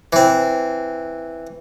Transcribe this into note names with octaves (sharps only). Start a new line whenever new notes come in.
E3 C4